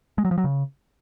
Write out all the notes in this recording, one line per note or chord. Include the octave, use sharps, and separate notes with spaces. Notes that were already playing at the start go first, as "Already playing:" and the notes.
G#3
F#3
F3
F#3
C#3